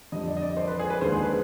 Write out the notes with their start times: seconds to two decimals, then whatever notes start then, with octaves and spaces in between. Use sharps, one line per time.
0.12 F2 D3 G3 D4 D#5
0.27 D5
0.37 D#5
0.42 D5
0.57 C5
0.67 B4
0.79 G#4
0.90 B4
1.01 D#2 D3 G#3 B3 D4 C5
1.13 G#4
1.23 B4